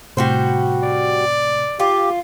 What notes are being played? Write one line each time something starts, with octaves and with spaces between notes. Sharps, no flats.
A2 C3 G3 F#4 C5
D5
F4 G4